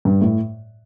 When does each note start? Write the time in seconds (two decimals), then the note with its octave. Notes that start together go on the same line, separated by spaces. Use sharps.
0.05 G2
0.21 A2